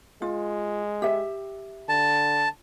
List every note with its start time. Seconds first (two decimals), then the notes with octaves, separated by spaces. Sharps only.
0.22 G#3 F4
1.02 G4 E5
1.89 D3 A5